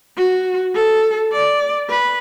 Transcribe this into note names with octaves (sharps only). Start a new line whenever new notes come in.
F#4
A4
D5
B4